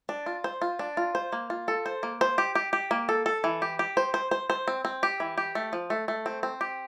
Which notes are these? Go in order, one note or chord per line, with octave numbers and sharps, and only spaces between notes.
D4
F4
C5
F4
D4
F4
C5
A#3
F4
A4
C5
A#3
C5
G4
G4
G4
A#3
A4
A4
E3
G4
G4
C5
C5
C5
C5
C4
C4
G4
E3
G4
A3
F3
A3
A3
C4
C4
G4